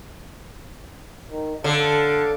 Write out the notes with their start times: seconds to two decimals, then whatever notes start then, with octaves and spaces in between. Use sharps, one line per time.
1.29 D#3
1.64 D3 A4 F5 A5